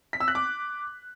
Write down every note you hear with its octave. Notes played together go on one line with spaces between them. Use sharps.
B6
E6
F#6
D6